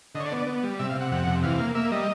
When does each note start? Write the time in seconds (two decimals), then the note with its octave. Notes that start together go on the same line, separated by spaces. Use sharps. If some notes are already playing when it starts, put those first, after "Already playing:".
0.15 D3 D#5
0.20 C#5
0.26 D5
0.32 B3
0.37 D5
0.47 B3
0.63 G3
0.79 C3 E5
0.90 F5
0.95 C3
1.01 F#5
1.11 F2 F#5
1.27 C3
1.43 E3 F5
1.59 A#3
1.75 A#3 E5
1.92 G3 D#5